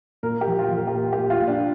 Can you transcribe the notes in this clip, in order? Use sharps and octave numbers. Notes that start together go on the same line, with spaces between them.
A#2 A#4
G4
F3
F4
F3
A#4
G4
A#2 A#4
G4
A#2
F4
A#2
D4